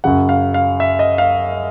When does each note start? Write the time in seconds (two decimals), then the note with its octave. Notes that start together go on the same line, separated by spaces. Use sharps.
0.04 F#2 C#3 F#3 F#5
0.29 F5
0.54 F5
0.80 E5
0.99 D#5
1.18 F5